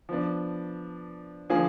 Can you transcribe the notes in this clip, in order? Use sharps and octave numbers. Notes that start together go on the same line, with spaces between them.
F3 B3 D4
D3 F3 A#3 F4 G#4